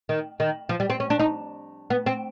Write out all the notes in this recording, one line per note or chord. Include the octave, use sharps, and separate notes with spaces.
D#3
D#3
F3
G3
C4
C#4
D4
D#4
B3
C4